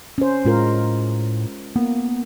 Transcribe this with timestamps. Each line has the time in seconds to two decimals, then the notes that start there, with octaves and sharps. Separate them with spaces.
0.18 C#4 C5
0.45 A2 G#3 F4 A#4
1.76 A#3 B3